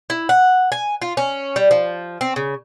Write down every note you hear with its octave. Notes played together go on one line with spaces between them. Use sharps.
E4
F#5
G#5
F4
C#4
G3
F3
C4
C#3